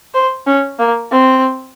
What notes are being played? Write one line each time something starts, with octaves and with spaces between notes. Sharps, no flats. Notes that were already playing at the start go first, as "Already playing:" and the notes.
C5
C#4
A#3
C4